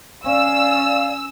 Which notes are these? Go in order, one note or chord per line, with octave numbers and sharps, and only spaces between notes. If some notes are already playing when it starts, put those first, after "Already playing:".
C#4 D5 F5 E6